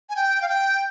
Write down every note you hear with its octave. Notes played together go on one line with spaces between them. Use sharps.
G#5
G5
F5
G5